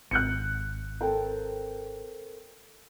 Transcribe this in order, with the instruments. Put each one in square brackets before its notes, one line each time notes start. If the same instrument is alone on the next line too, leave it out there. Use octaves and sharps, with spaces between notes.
[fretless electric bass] G#1 [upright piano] F#6 G6 C#7
[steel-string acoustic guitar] C4 A4 A#4 [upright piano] G5